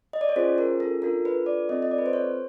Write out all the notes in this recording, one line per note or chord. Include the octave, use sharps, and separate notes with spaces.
D#5
D5
C#5
C#4 F4 G#4 C5
A#4
A4
D4 F4 A4 A#4
B4
D5
C4 F4 A4 D#5
D#5
D5
B4
C5
C#5